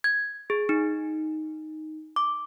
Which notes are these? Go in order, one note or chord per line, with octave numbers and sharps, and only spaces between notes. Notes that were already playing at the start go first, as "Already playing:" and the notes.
G#6
G#4
D#4
D6